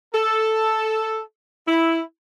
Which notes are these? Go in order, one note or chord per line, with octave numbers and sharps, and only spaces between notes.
A4
E4